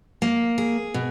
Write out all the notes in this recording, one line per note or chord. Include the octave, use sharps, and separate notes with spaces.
A#3
G#4
B2